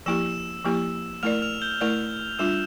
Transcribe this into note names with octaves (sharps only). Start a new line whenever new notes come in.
F3 A#3 E4 G4 E6 E7
F3 A#3 E4 G4
A3 E4 A#4 D5 F6 F7
F6 F7
G6 G7
A3 E4 A#4 D5 F6 F7
G3 D4 F4 E6 E7